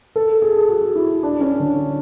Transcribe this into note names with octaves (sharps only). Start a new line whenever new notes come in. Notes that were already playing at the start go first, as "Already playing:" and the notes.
A4
G#4
F#4
E4
D4
C#4
D3